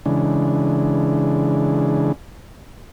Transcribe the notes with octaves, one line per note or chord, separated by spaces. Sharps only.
C#3 E3 G#3 D4